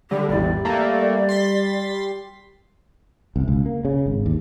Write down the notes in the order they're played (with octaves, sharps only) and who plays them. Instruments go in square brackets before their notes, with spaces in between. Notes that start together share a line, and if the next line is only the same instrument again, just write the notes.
[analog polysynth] D3 [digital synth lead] G3 [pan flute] G4
[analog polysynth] A1 E2 [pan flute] D5
[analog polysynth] A3 A#3
C6 A6 B6
[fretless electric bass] C2
C#2
A#3
C#3
G#1
D#2